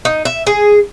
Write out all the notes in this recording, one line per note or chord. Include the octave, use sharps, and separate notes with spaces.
D#4
E5
G#4